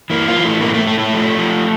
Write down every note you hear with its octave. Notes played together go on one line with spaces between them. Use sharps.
E3 A#3
F4
E3
A3
A2 A#3
A3
A2 A3
A3
F3
F3